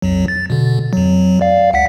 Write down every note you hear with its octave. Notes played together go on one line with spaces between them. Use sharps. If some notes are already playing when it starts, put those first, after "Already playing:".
B1 F2 F#3
A6
B2 D3
F2 F#3
D5 F5
C#2 F#5 B6